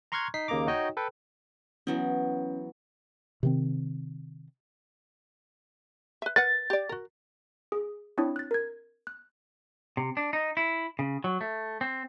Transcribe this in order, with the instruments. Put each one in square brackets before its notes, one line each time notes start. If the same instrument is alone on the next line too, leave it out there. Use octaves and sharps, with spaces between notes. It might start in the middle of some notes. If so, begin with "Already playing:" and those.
[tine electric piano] A#5 C6 C#6 F6 F#6 G#6
D#4 B6 C7
D#2 C#3 A#3 D#5 A#5 D6
D#4 F#4 C#5 D#5 G5
A4 B4 G5
[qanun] E3 F#3 B3 [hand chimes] C#4
[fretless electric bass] C3 D#3 C4
[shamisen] B4 E5
[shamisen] A#4 B4 F#5 [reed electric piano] A6
[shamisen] G4 D5
F#4 A#4
[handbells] G#4
C4 D4 E4 C#5 D#6
F#6 A6
A#4 G#6
F#6
[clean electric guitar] C3
D4
D#4
E4
C#3
F#3
A3
C4